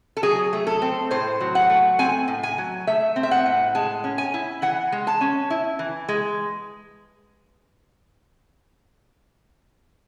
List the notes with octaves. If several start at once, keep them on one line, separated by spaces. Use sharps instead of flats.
A4
F#3 G#4
A3
A4
C4
A2 C5
F#3
F#5
A3
C4 G#5
A2
G#5
F#3
A3 E5
C4
E5
F#5
A2
G#3 A5
C#4
G#5
E4
E3 F#5
G#3
A5
C#4
E4
E3
G#3